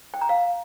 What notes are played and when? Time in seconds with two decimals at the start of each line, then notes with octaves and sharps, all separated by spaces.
0.14 G5
0.21 A#5
0.29 F5